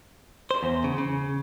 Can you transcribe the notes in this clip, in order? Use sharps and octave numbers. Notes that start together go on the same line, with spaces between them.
C5
E2
C#3
C#3